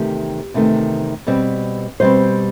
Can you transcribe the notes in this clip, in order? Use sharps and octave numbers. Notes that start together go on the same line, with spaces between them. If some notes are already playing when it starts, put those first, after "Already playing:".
Already playing: E2 C3 D#3 A3 G4
E2 C3 D#3 A3
B2 G3 C4
B2 G3 C4 C5